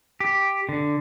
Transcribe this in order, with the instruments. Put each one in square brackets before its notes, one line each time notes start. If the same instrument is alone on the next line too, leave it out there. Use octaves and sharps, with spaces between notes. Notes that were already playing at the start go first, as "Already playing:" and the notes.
[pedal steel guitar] G4
D3